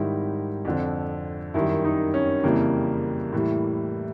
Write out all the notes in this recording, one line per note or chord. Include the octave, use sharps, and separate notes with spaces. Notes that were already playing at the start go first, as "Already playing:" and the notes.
Already playing: G#2 D#3 G3 E4
F2 D3 F3
F#2 D#3 G3 E4
D#4
C#4
F2 C#3 E3 G3 A#3
A2 E3 G3